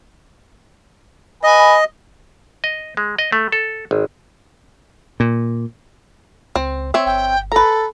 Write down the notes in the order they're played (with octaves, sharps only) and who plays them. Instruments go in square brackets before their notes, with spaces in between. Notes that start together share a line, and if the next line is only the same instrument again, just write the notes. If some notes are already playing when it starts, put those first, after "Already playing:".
[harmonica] B4 G#5 [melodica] D#5
[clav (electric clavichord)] D#5
G#3
D#5
A3
A4
G#1
[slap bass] A#2
[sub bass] C#2 [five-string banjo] C4
[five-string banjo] C4 C#5 E5
[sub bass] G1 [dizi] G5
[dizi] A4 [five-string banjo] B4 A#5